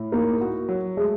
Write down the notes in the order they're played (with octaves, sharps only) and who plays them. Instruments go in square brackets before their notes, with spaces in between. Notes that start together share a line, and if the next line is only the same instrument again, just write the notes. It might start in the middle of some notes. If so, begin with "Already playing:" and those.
Already playing: [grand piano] A2
[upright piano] A#3 [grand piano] D#4
[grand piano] F#4
F#3
[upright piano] G#3 [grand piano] A3